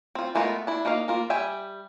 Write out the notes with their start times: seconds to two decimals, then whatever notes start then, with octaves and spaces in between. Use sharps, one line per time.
0.15 C4 F4
0.35 G#3 A3 B3 F4 A#4
0.67 D4 E4
0.85 A#3 D#4 D#5 F5
1.08 A#3 F4 A#4
1.30 G3 E5 G5 G#5